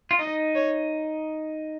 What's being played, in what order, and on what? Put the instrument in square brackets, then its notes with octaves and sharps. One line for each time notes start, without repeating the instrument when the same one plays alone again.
[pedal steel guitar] F4
[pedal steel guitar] D#4 [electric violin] D#5
[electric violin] C#5